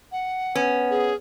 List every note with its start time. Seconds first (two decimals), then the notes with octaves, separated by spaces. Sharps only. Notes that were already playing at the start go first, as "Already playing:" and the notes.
0.12 F#5
0.55 B3 C#4
0.90 G#4